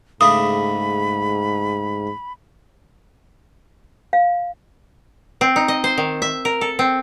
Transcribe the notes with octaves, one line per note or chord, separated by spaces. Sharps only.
G#2 C#3 A3 D4 B5 D#6
F5
C4
D#4
D#5
C5
D#3
E5
A#4
A4
C4